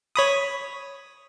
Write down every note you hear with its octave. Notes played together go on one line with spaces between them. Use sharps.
C#5 B5 D#6